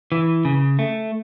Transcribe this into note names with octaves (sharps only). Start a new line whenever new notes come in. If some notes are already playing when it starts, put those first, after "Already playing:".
E3
C#3
A3